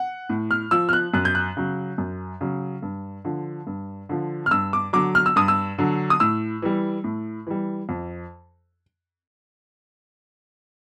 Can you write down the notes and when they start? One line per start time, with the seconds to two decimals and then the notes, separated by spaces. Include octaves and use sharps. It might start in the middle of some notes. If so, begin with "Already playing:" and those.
Already playing: F#5
0.29 A2
0.51 F6
0.71 F3 E6
0.89 F6
0.93 F#6
1.14 F#2 F#6
1.25 G6
1.35 F#6
1.57 C#3 F#3
1.98 F#2
2.41 C#3 F#3
2.82 G2
3.25 D3 F3
3.67 G2
4.09 D3 F3
4.46 F6
4.51 G2 E6
4.73 D6
4.93 D3 F#3 D6
5.15 F6
5.26 E6
5.36 G2 D#6
5.48 E6
5.78 D3 F#3
6.10 D#6
6.20 A2 E6
6.62 E3 G3
7.04 A2
7.47 E3 G3
7.89 F2